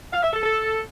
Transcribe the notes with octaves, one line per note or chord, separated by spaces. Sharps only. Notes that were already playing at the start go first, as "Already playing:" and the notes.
F5
E5
A4
A4